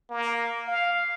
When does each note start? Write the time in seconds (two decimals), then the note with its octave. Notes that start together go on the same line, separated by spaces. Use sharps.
0.10 A#3
0.67 F5